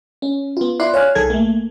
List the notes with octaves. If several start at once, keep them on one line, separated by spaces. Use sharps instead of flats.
C#4
B3 F4
E4 F4 D5 C6 F#6
C#5 F5 G#5 F6 F#6
B1 D#3 G#4 A4 G#6
A3 A#3